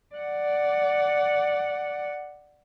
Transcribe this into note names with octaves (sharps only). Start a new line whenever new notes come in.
D5 F#5